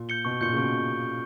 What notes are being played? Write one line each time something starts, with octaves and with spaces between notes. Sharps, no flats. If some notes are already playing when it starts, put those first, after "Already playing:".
Already playing: A#2
G6 C#7 G7
B2 C#6
A#2 G6 C#7 G7
C#3
B2 C#6